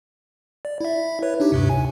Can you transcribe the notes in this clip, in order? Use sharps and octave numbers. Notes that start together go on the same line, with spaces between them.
D5
E4 E5
B4 C#5
D4 D#4 G4
D2 G2 C3
G#5